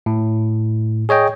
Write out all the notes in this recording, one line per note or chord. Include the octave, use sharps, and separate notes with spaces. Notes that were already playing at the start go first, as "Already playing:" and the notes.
A2
G#4 C#5 D#5 G5